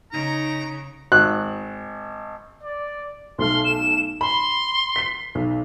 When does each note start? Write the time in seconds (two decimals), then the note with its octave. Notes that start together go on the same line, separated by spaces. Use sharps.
0.12 C#3 D#4 A#5
1.12 G#1 F#6
2.63 D5
3.39 B1 A3 C6 F6
3.64 E7
4.21 B5 C6
4.96 B6 C7
5.35 B1